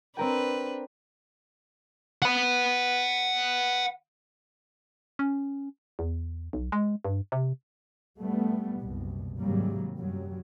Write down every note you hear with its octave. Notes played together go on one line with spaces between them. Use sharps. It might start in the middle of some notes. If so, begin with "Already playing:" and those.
C4 D4 A#4 B4 G5
F#5 B5
C#4
E2
B1
G#3
G2
C3
G3 A3 B3
F#1 C2 B2
D#2 G#2 C3 F#3 G3 A#3
F#2 F#3 G3